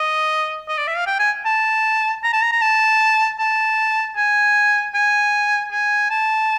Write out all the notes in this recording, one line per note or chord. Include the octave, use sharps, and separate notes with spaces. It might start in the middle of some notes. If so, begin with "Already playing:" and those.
Already playing: D#5
D#5
D5
E5
F5
G5
G#5
A5
A#5
A5
A#5
A#5
A5
A5
G#5
G#5
G#5
A5